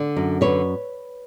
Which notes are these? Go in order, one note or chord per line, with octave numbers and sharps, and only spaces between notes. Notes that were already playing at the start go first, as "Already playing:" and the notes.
Already playing: D3
F#2
D3 B4 C#5